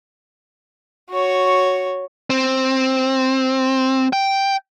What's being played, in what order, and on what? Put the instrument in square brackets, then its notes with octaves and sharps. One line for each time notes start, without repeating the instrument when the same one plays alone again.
[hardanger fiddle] F#4 C#5
[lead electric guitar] C4
G5